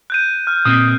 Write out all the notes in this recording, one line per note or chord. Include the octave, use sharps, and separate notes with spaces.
F#6 G6 D#7
F6
A#2 A#3 C4 D#6